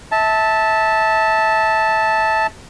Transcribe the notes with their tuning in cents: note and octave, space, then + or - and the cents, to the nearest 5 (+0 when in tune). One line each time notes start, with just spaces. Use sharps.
E5 -25 A5 +0